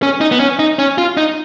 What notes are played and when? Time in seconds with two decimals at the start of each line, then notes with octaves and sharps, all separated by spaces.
0.03 C#4
0.21 D#4
0.31 B3
0.40 C#4
0.59 D#4
0.79 C#4
0.98 F4
1.17 D#4